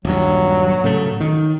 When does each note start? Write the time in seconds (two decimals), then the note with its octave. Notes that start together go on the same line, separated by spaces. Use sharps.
0.05 D#1 G2 F#3
0.84 A2 C#3 A3
1.20 D#3